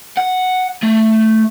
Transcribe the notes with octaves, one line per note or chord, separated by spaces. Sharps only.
F#5
A3